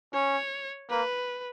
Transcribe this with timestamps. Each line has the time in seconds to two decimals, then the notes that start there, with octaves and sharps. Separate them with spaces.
0.14 C#4 C#5
0.90 A#3 B4